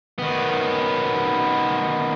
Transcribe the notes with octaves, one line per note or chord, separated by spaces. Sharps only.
D#3 B3